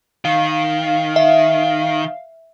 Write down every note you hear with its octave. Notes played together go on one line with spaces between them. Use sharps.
D#3 F5
E5